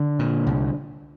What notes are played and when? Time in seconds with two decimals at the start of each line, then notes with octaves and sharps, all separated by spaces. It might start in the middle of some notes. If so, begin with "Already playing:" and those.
Already playing: D3
0.19 A#2
0.47 C2